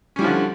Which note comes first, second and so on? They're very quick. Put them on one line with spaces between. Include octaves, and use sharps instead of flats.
C#4 G3 E4 F3 D3